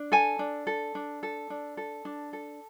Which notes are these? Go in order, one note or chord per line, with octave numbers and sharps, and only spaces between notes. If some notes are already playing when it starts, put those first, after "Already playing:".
Already playing: D4
A4 G#5
D4
A4
D4
A4
D4
A4
D4
A4